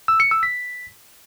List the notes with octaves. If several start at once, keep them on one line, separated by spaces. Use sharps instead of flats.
E6
C#7
E6
B6